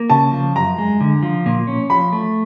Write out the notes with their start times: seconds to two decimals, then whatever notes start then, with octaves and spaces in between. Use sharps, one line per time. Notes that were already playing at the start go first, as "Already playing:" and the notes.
Already playing: A#3
0.10 C#3 A5
0.32 F3
0.55 F#2 A#5
0.78 G#3
1.01 D3
1.23 F3
1.46 A#2
1.67 C#4
1.90 F3 B5
2.13 A3